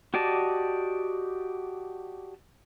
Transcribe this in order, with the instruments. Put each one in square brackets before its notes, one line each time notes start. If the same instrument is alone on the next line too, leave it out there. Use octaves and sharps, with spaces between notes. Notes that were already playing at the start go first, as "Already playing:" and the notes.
[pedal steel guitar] F#4 G4 D5 D#5 A5